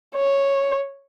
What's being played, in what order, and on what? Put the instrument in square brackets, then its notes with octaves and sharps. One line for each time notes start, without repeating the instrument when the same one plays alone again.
[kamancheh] C#5